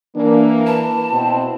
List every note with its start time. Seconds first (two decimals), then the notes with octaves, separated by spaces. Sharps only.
0.15 E3 A#3 D4
0.66 B4 A5
1.11 B2 C4 E4